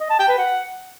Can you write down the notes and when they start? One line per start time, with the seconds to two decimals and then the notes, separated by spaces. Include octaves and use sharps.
0.01 D#5
0.10 A5
0.19 G5
0.29 B4
0.38 F#5